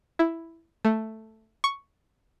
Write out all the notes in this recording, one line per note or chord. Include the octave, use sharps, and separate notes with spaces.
E4
A3
C#6